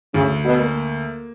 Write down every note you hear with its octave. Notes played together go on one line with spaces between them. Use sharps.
D2 C#3
B2
A#3